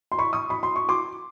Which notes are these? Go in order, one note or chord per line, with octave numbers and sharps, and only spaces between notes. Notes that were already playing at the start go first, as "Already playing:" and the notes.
C6
B5 C#6
C#6 D#6
B5
C6
C#6
C6 D6